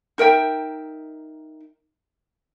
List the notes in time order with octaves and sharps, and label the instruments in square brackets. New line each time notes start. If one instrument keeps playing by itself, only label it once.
[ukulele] D#4 A#4 E5 G5